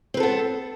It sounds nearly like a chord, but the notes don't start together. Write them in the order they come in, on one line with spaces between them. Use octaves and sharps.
C4 B4 A4 B3